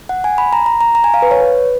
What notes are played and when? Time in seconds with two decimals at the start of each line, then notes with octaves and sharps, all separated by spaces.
0.09 F#5
0.24 G#5
0.38 B5
0.53 A#5
0.66 A#5
0.81 A#5
0.95 A#5
1.04 G#5
1.14 F5
1.22 B4
1.31 C#5
1.40 B4